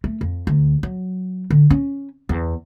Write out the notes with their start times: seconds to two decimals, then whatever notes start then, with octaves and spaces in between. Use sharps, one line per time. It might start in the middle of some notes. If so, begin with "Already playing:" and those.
0.04 A3
0.21 F2
0.47 D2
0.83 F#3
1.50 D3
1.70 C#4
2.29 E2